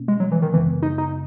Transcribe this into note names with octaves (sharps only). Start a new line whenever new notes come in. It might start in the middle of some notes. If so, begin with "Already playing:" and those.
Already playing: B2 A#3 C#4
G#3
F#3
E3
D#3
F#2 C#3 E3 G#3 B3
D#4
D#4